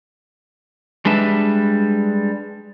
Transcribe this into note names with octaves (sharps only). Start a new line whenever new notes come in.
G3 G#3 D4 B4 E5